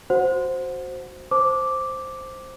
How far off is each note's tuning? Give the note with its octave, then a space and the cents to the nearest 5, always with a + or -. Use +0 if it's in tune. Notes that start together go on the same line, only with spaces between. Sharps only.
F#4 +0 C5 +0 F#5 -20
C5 +0 A5 +0 D6 +0